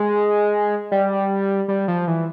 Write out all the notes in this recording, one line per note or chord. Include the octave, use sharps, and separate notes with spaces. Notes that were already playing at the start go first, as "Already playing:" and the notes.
Already playing: G#3
G3
G3
F3
E3